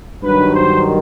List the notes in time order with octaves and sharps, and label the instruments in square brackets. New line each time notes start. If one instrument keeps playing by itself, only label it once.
[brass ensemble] G2 D#3 F#3 B4
C5